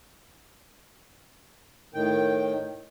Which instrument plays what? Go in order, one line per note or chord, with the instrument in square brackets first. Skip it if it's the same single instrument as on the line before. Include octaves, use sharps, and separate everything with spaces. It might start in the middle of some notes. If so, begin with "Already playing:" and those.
[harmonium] A2 D#3 G5